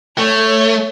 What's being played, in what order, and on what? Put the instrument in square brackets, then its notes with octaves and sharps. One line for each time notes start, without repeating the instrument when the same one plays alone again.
[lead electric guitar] A3 [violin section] C#5